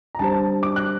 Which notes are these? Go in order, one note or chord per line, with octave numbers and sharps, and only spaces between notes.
A#5
G3 D4 G4 C5 A5
D6
F#6